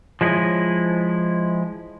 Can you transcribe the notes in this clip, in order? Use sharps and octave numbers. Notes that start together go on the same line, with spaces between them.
F3 G#3 E4 F4 C#5 D#5